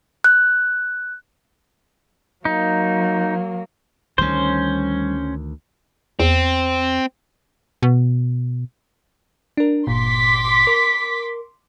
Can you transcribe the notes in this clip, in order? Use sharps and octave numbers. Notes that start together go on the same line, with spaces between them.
F#6
F#3 A#3 D#4
D2 D#3 G3 C#4 C5
E2 C4
B2
D4 A#4
G1 A#2 C6 D6 B6
A#4